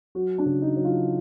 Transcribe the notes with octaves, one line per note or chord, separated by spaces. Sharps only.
F#3 F#4
D4
C#3
D#4
F#3
F4